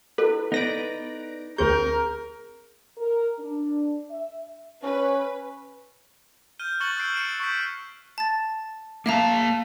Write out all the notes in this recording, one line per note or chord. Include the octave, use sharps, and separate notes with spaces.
E4 A4 B4
B3 D#4 B4 D5 A#6 D7
D2 C4 G#4 A#4 G6
A#4
D4
E5
C#4 B4
F6 G6 D#7 G7
C#6 F#6 A6 C#7 F#7 G7
E6 F6 G6 C7 D7
C#7 D7 E7
C#6 G6 B6
A5 A6
A#3 E5 F5 A5 A#5